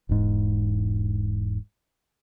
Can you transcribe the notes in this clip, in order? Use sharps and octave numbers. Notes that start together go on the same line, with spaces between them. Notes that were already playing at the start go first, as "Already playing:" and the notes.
E1 G#2